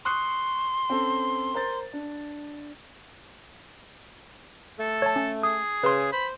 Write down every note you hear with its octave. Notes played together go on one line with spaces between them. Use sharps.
C6 C#6 D#6 F#6
C4 C#4 A4
A#4 C5 A6
D4
A3 A4
C#5 A5
C#4
G#4 D#6
C#3 B4 C6
C5 B5